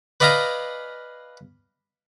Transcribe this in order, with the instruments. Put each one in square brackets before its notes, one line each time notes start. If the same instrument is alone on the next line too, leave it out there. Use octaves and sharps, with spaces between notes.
[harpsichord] B4 D5 D#5 F5 G#5 A#5